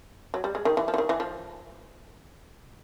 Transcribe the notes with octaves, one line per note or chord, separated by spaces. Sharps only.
F#3
G3
G#3
D#3
E3
F3
E3
D#3
E3
F3